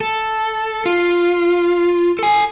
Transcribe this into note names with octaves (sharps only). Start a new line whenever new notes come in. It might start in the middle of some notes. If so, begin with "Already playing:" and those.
A4
F4
A4 G#5